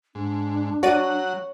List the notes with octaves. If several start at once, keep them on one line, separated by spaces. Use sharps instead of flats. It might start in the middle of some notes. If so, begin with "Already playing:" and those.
G#2 D4
F#3 F#4 C#5 D5 F#5 D#7